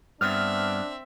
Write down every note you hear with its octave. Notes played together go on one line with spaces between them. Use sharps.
G2 B3 C4 D4 E5 F6